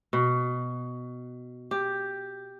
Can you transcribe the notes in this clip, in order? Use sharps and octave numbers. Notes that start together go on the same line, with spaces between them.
B2
G4